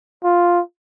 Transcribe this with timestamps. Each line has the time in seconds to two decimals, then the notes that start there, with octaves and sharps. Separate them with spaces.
0.24 F4